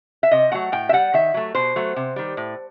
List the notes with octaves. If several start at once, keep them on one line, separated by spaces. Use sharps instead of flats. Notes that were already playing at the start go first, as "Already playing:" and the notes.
E5
C3 D#5
F#3 A3 F#5
A2 G5
E5
G3 F#5
D#3 E5
F#3 A3
B2 C5
F#3 A3
C3
D#3 G3
A2